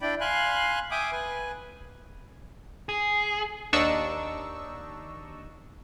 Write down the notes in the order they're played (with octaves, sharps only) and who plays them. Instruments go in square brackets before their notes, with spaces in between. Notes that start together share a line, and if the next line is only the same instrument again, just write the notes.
[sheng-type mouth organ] D4 E4 D5 G5 B5
F5 G#5 B5 C6 F#6
E5 G5 G#5 D6 D#6
B4 G#5
[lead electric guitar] G#4
[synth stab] D#2 D4 D#4 C#6 E6